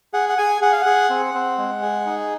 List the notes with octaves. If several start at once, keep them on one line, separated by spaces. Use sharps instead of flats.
G#4 F#5
F#5
G#4 G#5
G#4 F#5
F5
G#4 F#5
C4
C4
G#3
G#4
D#4